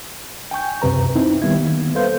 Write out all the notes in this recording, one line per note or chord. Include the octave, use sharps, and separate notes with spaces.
G5 G#5 C#6 G6
C#2 F#2 C3 B4 A#5
C4 D#4 E4
D#3 G3 A#3 B3 E5 G#6
A4 B4 C5 F5 C6 G6